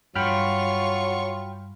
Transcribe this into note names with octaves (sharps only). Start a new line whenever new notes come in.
G2 F#3 F4 G5 B5 C#6 F6